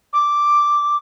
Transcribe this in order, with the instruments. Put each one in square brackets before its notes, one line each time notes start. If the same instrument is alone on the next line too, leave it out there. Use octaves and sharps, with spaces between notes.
[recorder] D6